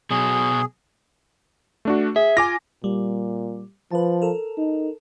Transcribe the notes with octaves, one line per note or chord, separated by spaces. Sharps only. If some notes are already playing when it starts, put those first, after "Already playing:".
B2 F#3 G#4
A3 D4 F#4
G#4 E5
F4 G#5 D6 A#6
A#2 G3
F3 B4 A5
A4 A#4
D#4